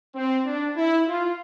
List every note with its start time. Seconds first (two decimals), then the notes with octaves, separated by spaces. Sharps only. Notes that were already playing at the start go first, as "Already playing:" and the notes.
0.15 C4
0.46 D4
0.76 E4
1.07 F4